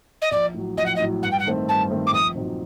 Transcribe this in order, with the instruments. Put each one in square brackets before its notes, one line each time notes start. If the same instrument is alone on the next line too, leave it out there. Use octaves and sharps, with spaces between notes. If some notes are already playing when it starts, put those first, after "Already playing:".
[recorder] D#5
[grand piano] A#1 [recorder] D5
[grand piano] A2 F#3
[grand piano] A#1 [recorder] D#5
[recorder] F#5
D#5
[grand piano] A2 F#3
[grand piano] G2 [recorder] F#5
[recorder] G5
F#5
[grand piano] D#3 A3 C4
[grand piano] G2 [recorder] A5
[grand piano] D#3 A3 C4
[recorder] D6
[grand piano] A#1 [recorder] D#6
[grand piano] A#2 F#3 C4 D#4